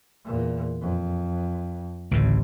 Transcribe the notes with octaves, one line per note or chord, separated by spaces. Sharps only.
E2 A#2
F2
A1 D2 A2 C#3